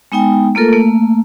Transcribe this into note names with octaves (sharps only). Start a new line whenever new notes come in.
G#3 B3 D#4 G5 G#5
A3 A#3 F4 A4 A#4
A3 A#3